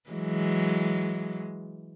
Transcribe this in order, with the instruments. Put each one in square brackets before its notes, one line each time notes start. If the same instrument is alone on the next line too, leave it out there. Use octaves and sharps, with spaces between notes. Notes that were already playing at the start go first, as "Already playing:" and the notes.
[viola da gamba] E3 F#3 G#3